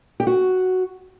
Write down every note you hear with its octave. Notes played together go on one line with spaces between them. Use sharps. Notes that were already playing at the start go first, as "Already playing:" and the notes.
G4
F#4